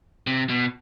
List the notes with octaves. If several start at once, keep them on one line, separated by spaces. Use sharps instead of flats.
C3
B2